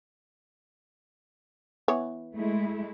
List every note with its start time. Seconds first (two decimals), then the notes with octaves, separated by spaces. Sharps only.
1.88 E3 B3 C#5
2.36 G#3 A3 E4